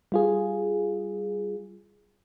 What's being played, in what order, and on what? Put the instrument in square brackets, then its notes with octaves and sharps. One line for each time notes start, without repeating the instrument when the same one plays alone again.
[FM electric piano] G3 F4 G#4